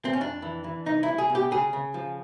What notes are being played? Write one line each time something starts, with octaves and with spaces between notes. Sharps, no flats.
C4
C#4
F2 D4
E3
E3
C2 D#4
E4
C2
G#4
B2
G4
C#3 G#4
C#3
F3